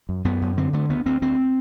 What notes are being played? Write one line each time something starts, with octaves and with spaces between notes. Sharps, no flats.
F#2
F#2 B3
F#2
D3 C4
D3 A3
D2 B3
D2 C4
D2 C4